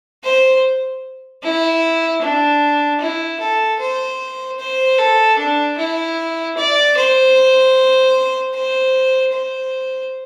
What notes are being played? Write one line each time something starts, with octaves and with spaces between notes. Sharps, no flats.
C5
E4
D4
E4
A4
C5
C5
A4
D4
E4
D5
C5
C5
C5